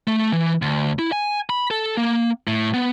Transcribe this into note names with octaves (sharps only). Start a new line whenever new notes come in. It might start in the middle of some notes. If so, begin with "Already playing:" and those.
A3
E3
D2
E4
G#5
B5
A4
A#3
A2
B3